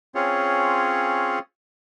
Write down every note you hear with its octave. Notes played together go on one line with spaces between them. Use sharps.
C4 C#4 F4 G#4 C#5